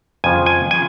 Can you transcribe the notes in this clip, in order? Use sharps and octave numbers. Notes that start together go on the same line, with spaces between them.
F2 C#3 F3 G#5
G#5
C#3 F3 G#5